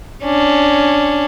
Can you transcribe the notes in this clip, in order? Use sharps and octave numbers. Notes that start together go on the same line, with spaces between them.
C#4 D4